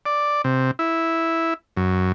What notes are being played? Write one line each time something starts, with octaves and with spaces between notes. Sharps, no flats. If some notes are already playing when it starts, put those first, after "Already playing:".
D5
C3
E4
F#2